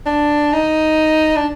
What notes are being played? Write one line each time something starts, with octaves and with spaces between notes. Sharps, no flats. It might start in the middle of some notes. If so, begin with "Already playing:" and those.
D4
D#4
D4